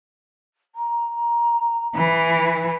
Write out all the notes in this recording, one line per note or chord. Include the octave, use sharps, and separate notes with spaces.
A#5
E3 B5